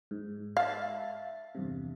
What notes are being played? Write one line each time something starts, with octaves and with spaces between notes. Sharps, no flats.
G#2
E5 F5 A5 A6
E2 G2 C3